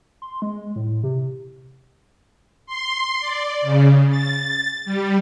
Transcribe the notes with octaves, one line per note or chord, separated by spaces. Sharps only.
C6
G#3
A2
C3
C6
D5
C#3
A6
G3